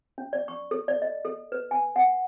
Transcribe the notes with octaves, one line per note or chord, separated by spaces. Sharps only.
C#4
D5
C#6
A4
D5
D#5
A4
B4
G#5
F#5